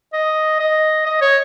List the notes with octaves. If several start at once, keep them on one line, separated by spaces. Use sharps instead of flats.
D#5
D#5
D#5
C#5